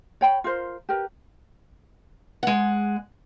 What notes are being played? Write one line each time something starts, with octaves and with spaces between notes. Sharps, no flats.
C#5 G5 B5
F4 A#4 C5
G4 A#4 B4
G#3 F#5